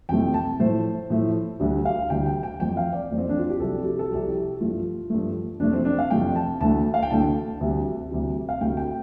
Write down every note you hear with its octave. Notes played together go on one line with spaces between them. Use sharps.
F2 C3 F3 A3 G5
A5
A2 F3 A3 C5
A2 F3 A3
D2 D3 G3
F5
D2 D3 G3 G5
G5
G5
F2 F3 A3 G5
F5
D5
F2 F3 A3
C4
D4
F4
G4
C2 C3 F3 A4
G4
A4
C2 C3 F3 G4
G2 F3 A3 F4
G2 F3 A3
F2 C3 F3 A3 D4
C4
D4
F5
F2 C3 F3 A3 G5
A5
D2 D3 A3 A5
F5
G5
D2 D3 A3 A5
D2 C3 G3
D2 C3 G3
F5
D2 C3 A3 G5
G5